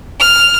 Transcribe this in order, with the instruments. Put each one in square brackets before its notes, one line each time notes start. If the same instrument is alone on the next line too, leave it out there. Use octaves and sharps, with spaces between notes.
[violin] F6